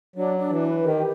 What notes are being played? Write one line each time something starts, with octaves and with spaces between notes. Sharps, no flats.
F#3 D4
D4
E3
B4
D#3 G4